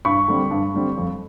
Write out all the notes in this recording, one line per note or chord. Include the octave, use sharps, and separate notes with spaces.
G2 B5 C#6
D3 G3 C4
G2
D3 G3 C4
F2